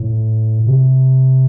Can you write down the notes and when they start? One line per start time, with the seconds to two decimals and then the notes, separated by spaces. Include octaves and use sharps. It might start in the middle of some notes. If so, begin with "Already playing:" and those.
Already playing: A2
0.66 C3